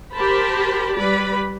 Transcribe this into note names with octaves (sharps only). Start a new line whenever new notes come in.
G4 A#4 C5 A5 B5
G3 B4 D5 B5